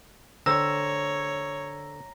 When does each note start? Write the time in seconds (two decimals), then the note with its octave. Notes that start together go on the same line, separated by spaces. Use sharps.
0.46 D3 C5 C#5 G5 A#5 E6 A#6